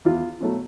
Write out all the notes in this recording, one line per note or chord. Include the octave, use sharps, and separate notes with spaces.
E2 F4
B2 F#3 A3